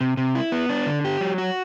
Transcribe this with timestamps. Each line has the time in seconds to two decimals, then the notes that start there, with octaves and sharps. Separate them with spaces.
0.01 C3
0.17 C3
0.35 E4
0.52 B3
0.69 D4
0.87 D3
1.05 G4
1.21 F#3
1.38 F#4